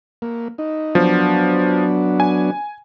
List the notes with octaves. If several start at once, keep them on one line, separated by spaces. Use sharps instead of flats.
A#3
D#4
F3 F#3 B3 D4
G#5